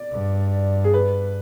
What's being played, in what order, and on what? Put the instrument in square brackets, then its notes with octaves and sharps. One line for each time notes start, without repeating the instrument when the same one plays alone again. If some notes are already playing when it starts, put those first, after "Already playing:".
Already playing: [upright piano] D5
[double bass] G2
[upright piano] G#4
B4